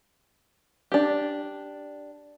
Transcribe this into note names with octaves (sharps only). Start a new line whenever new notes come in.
D4 G4